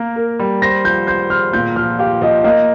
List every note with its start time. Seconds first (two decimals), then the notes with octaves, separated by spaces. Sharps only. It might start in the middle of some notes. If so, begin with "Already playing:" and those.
Already playing: A#3 A#4
0.16 A#4
0.39 G3
0.62 C5 A#6
0.84 F3 G6
1.07 C5 G6
1.30 C5 F6
1.53 A#2 G6
1.76 F3 F6
1.99 G4 F5
2.21 F3 D#5
2.44 A#3 D#5